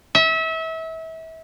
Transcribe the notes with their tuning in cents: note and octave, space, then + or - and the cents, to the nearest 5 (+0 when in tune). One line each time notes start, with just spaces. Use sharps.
E5 -30